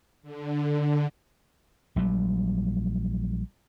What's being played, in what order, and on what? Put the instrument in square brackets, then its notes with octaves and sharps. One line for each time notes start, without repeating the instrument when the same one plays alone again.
[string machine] D3
[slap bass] A#1 F#3 G3